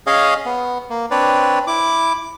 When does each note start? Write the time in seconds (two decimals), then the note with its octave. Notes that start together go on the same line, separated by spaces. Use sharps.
0.07 C#4 G#4 C#5 D#5 F5
0.45 B3
0.90 A#3
1.11 C4 D4 B4 C#5 D5
1.67 E4 D6